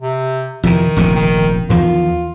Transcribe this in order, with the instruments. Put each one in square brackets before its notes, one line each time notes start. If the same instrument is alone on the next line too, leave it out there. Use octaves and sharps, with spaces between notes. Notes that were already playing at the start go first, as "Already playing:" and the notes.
[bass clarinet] C3
[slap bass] F2 C3 E3 [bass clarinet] D#3
[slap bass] F1 A#1 C3
[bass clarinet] D#3
[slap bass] E2 D#3 F3 [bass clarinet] F4